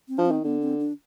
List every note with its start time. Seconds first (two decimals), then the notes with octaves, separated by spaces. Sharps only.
0.08 C4
0.18 F3 D4
0.26 C4
0.31 D#3
0.44 D3 B3
0.61 C4
0.80 D4